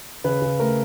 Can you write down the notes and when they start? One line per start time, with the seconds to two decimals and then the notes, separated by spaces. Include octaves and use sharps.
0.24 C#3 B4
0.42 C#3
0.60 A3 A#4